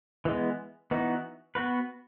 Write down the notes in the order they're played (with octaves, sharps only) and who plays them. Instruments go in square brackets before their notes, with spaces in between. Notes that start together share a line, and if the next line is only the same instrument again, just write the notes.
[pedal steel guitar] E3 G#3 B3
E3 B3 D#4 F#4
B3 F#4 B4